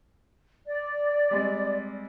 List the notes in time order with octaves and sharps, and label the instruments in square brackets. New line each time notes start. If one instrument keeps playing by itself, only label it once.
[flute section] D5
[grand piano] G3 G#3 C4